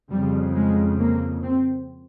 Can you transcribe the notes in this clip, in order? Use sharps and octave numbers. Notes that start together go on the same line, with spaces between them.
F2 G3
C#3
G#3
A#3
C4